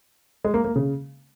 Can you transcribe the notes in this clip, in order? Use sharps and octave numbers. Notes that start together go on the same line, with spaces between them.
G#3
A#3
A#3
C#3